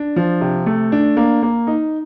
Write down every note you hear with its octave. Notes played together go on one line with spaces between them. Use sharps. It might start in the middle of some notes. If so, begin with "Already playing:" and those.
Already playing: D4
F3
C3
A3
D4
A#3
A#3
D#4